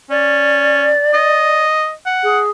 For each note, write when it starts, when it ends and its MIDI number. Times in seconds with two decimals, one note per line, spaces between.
0.11 0.91 61
0.11 1.65 74
1.14 1.93 75
2.06 2.40 78
2.23 2.50 68